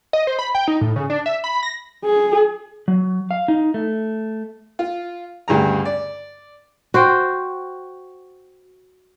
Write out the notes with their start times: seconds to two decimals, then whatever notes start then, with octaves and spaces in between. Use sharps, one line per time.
0.13 D#5
0.27 C5
0.39 B5
0.55 G5
0.68 D#4
0.81 A2
0.96 C#3
1.10 D4
1.26 E5
1.44 B5
1.63 A#6
2.05 G#4
2.88 F#3
3.31 F5
3.48 D#4
3.74 A3
4.79 F4
5.48 D2 G2 C#3 A#5
5.85 D5
6.94 F#4 C5 G5